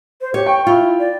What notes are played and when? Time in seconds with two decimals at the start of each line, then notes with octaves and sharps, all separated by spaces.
0.21 C5
0.34 G4 C#5
0.46 G5 C#6
0.67 E4 F4
0.99 D5